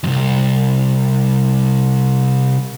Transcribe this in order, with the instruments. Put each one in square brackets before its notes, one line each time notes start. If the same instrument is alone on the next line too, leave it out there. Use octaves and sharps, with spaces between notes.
[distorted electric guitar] C2 F2